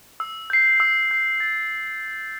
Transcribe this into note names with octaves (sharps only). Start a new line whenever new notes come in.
E6
G6 C7
E6
G6 C7
A6